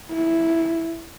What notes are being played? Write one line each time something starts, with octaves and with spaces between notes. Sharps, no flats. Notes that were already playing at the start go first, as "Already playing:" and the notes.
E4